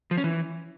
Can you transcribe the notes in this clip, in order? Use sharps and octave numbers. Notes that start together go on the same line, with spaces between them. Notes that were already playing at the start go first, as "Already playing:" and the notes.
F3
C#4
E3